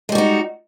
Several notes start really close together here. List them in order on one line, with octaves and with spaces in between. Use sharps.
G#3 G3 F#4 D#4